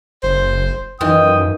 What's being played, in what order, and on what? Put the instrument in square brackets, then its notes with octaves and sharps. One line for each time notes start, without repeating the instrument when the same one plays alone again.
[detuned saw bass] F#1 [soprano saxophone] C5
[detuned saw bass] F#2 [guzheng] D#3 E3 F4 [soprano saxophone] G5 [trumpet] D#6